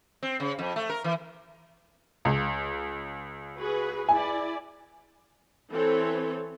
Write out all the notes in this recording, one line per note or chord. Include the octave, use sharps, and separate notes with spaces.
C4
C#3
F2
A3
A#4
E3
C#2
F#4 G#4 B4
E4 D5 G#5
E3 C4 A4 C#5